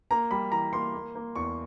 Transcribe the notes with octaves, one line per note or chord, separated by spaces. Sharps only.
A#3 A#5
G3 B5
E3 A#5
A#3 C6
A#3
A#3
E2 C#6